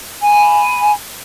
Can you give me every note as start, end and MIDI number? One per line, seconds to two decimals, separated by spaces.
0.23 0.91 80
0.23 0.91 83